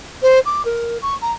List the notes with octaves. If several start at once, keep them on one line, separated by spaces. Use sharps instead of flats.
C5
D6
A#4
C#6
A#5